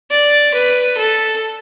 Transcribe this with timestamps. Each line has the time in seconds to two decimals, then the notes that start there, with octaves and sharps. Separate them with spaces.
0.11 D5
0.54 B4
0.97 A4